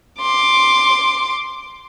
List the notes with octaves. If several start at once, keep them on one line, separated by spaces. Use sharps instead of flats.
C6 D6